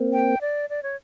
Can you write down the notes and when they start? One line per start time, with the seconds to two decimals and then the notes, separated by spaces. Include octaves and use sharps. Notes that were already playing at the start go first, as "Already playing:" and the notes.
Already playing: A#3 C4
0.13 G5
0.41 D5
0.70 D5
0.83 C#5